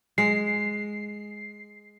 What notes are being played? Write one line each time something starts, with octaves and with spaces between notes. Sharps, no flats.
G#3 C7